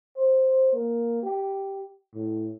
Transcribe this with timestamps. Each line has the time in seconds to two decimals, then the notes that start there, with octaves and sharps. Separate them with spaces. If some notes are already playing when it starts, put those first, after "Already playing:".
0.17 C5
0.73 A#3
1.23 G4
2.14 A2